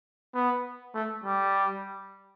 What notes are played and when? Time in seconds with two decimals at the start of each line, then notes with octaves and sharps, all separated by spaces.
0.34 B3
0.94 A3
1.24 G3